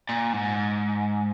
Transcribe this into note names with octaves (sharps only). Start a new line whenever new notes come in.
A#2
G#2